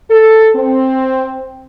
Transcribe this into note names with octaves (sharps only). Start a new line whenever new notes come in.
A4
C4